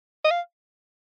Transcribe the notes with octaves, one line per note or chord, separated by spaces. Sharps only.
D#5
F5